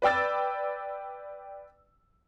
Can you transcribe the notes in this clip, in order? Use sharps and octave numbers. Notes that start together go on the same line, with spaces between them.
B4 D5 G5 E6 A6